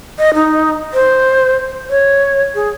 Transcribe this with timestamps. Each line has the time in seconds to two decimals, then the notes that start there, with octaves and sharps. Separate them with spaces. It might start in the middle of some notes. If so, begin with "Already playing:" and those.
0.19 D#5
0.34 D#4
0.94 C5
1.89 C#5
2.55 G#4